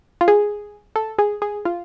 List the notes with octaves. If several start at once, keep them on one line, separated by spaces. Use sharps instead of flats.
F4
G#4
A4
G#4
G#4
F4